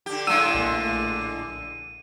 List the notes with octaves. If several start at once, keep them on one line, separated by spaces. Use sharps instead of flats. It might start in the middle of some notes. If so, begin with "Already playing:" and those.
D3 G4
A2 D3 G#3 F#5 E6 D#7
A#1 A3 A#3